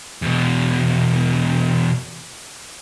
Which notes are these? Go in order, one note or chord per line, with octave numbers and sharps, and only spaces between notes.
E2 B2